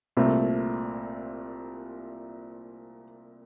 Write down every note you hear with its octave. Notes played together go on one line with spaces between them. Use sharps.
C2 A#2 A3 C4